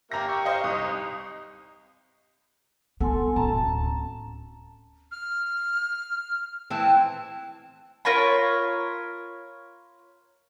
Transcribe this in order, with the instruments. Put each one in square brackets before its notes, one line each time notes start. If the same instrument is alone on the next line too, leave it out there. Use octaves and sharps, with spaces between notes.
[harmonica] A#3 G4 E5 [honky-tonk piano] A#5 A#6
[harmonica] G4 C#6
[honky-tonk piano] C5 D#5 F5
[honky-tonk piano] C2 D#6 [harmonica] D#4
[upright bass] B3 D4 [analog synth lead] A4 [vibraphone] F#5 G#5 C6
[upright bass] D1 [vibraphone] C#4 A#5 [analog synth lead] A5
[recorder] F6
[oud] E3 C4 [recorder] A5
[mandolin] F4 A#4 C#5 B5